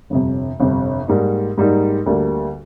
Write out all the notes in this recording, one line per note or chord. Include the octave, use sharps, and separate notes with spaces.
G1 F2 C3
G1 F2 C3
G#2 G3 A#3 D#4
G#2 G3 A#3 D#4
D2 D3 G3 A#3